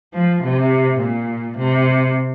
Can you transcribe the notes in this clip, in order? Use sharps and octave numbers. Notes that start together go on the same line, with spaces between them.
F3
C3
A#2
C3